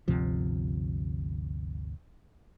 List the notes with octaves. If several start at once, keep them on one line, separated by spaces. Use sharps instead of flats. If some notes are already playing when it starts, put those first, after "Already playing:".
G1 D2 C3 F3